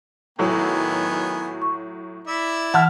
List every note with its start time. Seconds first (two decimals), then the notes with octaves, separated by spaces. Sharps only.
0.39 A2 D#3 F#3 B3 G#5
1.62 C#6
2.27 E4 D5 E5
2.74 E3 F#5 A5 F6